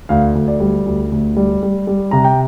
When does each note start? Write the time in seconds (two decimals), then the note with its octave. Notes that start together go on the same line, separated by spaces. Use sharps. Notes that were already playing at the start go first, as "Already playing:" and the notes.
0.09 D2 F5
0.35 D2
0.48 D5
0.60 G3
0.86 D2
1.12 D2
1.37 G3
1.63 G3
1.87 G3
2.11 C3 A#5
2.24 G5